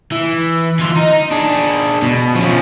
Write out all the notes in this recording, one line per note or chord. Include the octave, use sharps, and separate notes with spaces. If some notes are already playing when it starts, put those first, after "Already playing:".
E3
E3 F4
D#4
D4 G#4
B2
F3 C#4